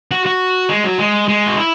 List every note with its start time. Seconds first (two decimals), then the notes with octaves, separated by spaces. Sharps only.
0.11 F#4
0.26 F#4
0.69 G#3
0.84 F#3
0.98 G#3
1.28 G#3
1.46 F#4
1.57 E4